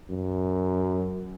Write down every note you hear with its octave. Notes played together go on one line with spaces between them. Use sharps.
F#2